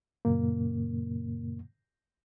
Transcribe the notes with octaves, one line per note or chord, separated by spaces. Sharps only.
F#2 A#2 C#3 A#3